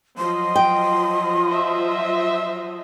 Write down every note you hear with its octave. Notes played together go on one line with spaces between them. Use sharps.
F3 F#3 D#5 C6
G5
C5 E5